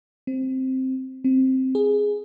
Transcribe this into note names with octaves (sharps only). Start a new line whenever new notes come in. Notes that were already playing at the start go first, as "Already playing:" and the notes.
C4
C4
G#4